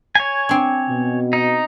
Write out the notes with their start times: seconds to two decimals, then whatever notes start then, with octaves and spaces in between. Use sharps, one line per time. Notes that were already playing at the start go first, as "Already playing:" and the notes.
0.15 C#5 G#5
0.49 C4 D4
0.89 B2
1.33 D#4